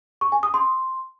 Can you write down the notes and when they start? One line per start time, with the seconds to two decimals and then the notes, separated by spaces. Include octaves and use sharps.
0.21 C#6
0.32 G#5
0.43 D#6
0.54 C6